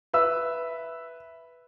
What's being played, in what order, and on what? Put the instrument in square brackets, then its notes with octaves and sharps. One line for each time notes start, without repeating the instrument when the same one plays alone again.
[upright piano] B4 E5 E6